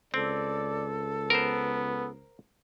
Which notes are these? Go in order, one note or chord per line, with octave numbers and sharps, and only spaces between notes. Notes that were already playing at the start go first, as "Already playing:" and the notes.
C#2 C4 A4 D5
B3 A#4 C5